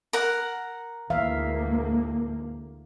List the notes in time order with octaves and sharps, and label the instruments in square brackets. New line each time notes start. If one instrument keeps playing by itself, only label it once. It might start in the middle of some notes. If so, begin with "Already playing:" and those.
[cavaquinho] A#4 F#5
[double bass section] D2 G#2 A#3 [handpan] E3 E5 F5